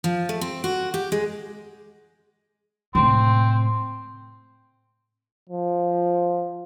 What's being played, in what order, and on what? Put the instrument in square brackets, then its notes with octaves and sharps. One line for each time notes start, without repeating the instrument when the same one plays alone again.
[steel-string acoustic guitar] F3
A3
C4
F#4
G4
G#3
[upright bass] A2 C3 [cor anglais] C4
[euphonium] F3